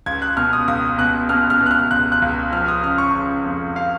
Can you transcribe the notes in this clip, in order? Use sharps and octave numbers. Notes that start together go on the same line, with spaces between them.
C#2 G#6
F#6
B2 F6
D#6
C#2 D#6
B2 F#6
B2 F6
F6
B2
F#6
F6
C#2 F#6
F#6
C#2
F3 F6
D#6
C#3 F6
C#6
C#3
F2
C#3 F5